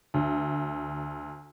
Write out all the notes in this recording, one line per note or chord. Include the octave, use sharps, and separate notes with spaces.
D2